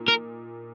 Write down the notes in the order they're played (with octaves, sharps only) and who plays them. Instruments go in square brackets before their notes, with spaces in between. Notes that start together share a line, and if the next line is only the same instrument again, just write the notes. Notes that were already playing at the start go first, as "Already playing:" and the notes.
Already playing: [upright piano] A#2 D#4
[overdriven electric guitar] A#4